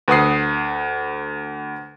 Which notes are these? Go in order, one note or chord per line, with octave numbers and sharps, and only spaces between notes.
D2 B4 F#5 D#6 C7